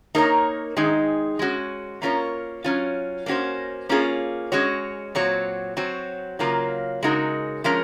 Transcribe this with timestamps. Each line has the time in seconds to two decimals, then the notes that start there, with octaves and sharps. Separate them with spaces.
0.15 A#3 D#4 A#4 C#5
0.77 D#3 G#3 D#4 G#4
1.39 G#3 C#4 F#4
2.02 A#3 C#4 F4 A#4 C#5
2.64 F#3 C#4 F4
3.26 A#3 C#4 F#4 C5
3.89 A#3 C#4 F4 G#4
4.52 G#3 C#4 F#4 C#5
5.15 A#2 F#3 C4 F#4 C#5
5.77 F#3 C4 F#4 C#5
6.39 C#3 F#3 A#3 F4 A#4
7.03 C#3 G#3 D#4 F#4 A#4
7.64 F3 G#3 C#4 F4 A#4